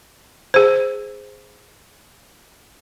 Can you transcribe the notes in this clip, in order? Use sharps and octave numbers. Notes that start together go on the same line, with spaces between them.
G#4 C5